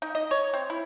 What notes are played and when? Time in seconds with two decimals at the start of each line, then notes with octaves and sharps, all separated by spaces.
0.02 D#4
0.15 D#5
0.31 C#5
0.54 C4
0.70 E4